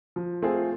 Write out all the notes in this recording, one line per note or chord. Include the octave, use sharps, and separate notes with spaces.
F3
A3 C4 F4 G#4